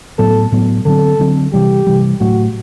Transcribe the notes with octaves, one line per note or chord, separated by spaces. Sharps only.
A2 F#3 B3 A4
A2 F#3 B3
D3 F#3 C4 A4
D3 F#3 C4
C3 E3 G3 G4
C3 E3 G3
A2 F#3 A3 F#4